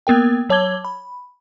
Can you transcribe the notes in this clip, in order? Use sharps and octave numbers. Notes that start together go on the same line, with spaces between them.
A#3 B3 A#4 G5
F#3 C#5 A5 D6 G#6 G7
B5